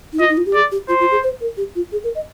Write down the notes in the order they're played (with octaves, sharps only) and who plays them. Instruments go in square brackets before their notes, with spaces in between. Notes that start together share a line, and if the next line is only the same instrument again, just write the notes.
[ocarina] D#4
[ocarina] F4 [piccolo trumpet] D#5
[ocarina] D#4
F4
G4
[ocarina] G#4 [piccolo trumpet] D5
[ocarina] G4
[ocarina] F4 [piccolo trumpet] C5
[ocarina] F4
G#4
C5
A#4
G4
F4
G#4
A#4
D#5